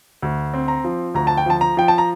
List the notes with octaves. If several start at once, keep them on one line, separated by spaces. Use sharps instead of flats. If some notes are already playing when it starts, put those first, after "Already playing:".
D2
C4
A#5
F3
D2 A#5
A5
G5
F3 A5
A#5
F3 G5
A5
A#5